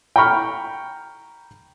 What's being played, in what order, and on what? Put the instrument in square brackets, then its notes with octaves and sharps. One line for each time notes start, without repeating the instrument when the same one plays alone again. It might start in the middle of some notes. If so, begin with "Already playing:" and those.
[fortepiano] G5 A#5 B5 C#6 F6